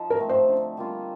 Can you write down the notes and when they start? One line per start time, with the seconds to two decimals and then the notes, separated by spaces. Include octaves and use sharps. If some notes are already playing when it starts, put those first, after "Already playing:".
Already playing: F3 D#4
0.10 A#4
0.19 A3 C4
0.29 C5
0.49 D3
0.77 G3 A#3 F4